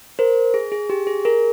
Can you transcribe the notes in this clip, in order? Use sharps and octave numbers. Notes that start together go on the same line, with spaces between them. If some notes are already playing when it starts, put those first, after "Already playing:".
A#4 C5
G#4
G#4
G4
G#4
G#4 A#4